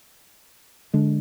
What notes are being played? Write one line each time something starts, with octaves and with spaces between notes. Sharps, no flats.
D3 G#3 D4